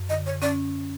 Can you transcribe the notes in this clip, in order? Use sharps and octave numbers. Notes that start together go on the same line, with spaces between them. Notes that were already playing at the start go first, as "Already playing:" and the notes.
Already playing: F#2
D3 D#5
C#5
C#4 D5